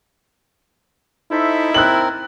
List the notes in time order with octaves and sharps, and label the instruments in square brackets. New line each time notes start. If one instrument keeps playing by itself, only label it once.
[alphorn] D#4 [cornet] E4 [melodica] A4 C5 E5
[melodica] C4 A#4 [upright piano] F#6 F#7